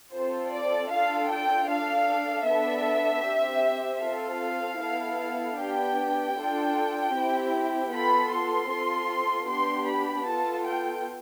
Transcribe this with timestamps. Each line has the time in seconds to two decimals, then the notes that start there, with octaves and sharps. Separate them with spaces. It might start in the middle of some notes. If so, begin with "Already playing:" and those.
0.13 C4 F4 A4 C5
0.51 D5
0.90 D4 F4 A4 F5
1.29 G5
1.68 D4 A4 F5
2.46 B3 D4 A4 E5
3.24 C4 G4
4.02 C4 F4 A4 F5
4.80 B3 E4 A4
5.58 B3 D4 G4 G5
6.35 D4 F4 A4
7.14 C4 E4 G4
7.92 B3 F4 A4 B5
8.31 C6
8.70 C4 F4 A4
9.47 B3 D4 G4 C6
9.86 B5
10.25 B3 F4 A4 A5
10.64 G5